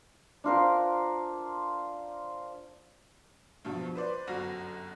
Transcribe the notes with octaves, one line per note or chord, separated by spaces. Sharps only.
D4 F4 A#4 C5
G2 B2 F3
B4 C5 D5
G1 F#2 F#4 A#6